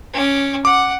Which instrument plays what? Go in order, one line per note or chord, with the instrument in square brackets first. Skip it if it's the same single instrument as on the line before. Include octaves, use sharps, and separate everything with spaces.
[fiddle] C#4 D6
[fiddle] F#5 [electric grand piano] D6